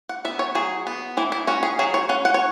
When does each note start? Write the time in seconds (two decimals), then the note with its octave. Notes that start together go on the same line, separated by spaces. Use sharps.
0.09 F#5
0.25 B3 E5
0.39 C#5
0.55 F#3 G#4
0.87 B3
1.17 E3 E4
1.32 E4
1.47 C#4 F#4
1.63 G#4
1.79 F#3 G#4
1.94 C#5
2.09 C#4 F#5
2.25 F#5
2.34 C#5